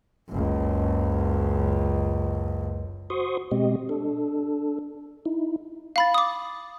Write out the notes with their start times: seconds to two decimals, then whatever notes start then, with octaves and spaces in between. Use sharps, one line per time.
0.30 F#1 C#2
3.10 F#4 C5 C6 C#6 D#6
3.51 B2 G#3 C4 G4 D#5
3.89 D4 A4
5.26 D#4 E4
5.96 F5 B5 A6
6.14 D6 D#6